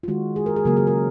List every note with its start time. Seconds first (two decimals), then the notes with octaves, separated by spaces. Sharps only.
0.03 F4
0.08 D#3 G#3 F#4
0.36 G#4
0.46 A#4
0.56 G#4
0.65 C#3 F#3 A#3 A#4
0.77 G#4
0.87 A#4